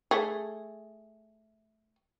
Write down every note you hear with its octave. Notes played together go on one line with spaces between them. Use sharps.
A3 G#4